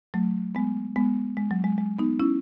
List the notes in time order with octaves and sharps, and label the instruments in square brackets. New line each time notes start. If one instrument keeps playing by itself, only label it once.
[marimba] F#3 A3
G#3 B3
G#3 B3
G#3
F#3
G#3
G#3
B3 D#4
C#4 E4